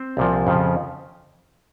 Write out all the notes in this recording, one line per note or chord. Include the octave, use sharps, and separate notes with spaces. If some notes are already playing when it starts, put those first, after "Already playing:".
Already playing: C4 C5
C2 A#2 F3
F2 C#3 F3